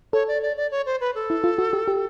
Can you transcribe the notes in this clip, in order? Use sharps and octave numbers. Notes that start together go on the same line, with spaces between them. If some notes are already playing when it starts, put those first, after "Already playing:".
A4 C#5
D5
D5
D5
C#5
C5
B4
A4
E4
F4
F#4
G4
G4